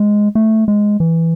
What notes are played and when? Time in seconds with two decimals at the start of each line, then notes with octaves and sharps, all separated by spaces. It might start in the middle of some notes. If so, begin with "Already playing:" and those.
Already playing: G#3
0.35 A3
0.68 G#3
1.00 E3